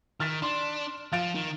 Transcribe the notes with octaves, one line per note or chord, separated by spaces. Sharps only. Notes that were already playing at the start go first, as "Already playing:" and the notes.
D#3 F6 A6 B6
D4 C6
F3 F5 A6 D7
D#3